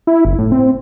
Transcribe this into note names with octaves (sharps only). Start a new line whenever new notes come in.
E4
F#1
A2
C4